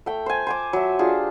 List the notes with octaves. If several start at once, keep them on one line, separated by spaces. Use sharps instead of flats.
A3 G5
C5 G#5
C5 G#5 D6
F#3 E5
D4 F4 G4 G#4